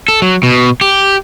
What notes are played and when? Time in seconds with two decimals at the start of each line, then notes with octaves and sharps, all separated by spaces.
0.08 A4
0.22 F#3
0.43 B2
0.81 G4